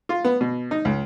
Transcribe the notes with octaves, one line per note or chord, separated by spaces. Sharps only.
F4
B3
B2
D#4
C#2